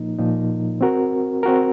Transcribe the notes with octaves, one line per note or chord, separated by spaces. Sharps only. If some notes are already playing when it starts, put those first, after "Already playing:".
Already playing: A#2 F3 A#3 D#4
A#2 F3 A#3 D#4
C4 F#4 A#4
C4 F#4 A#4